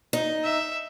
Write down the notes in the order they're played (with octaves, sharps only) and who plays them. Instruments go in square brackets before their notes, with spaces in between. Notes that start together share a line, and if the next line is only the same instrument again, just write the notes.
[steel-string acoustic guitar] D#4
[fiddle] E5